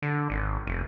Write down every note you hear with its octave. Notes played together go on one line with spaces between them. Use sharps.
D3
G#1
F1